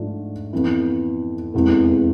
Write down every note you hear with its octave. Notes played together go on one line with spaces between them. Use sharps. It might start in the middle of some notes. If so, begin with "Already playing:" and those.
Already playing: G#2 F3 A3 D4 F4
F2 E3 B3 E4
F1 E2 C3 E3 G#3